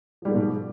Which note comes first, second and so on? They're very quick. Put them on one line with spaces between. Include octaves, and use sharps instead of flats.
F3 G3 G#2 A#3 B2